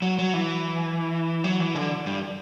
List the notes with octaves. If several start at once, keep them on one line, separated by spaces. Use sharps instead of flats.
F#3
F#3
E3
F#3
E3
D3
G2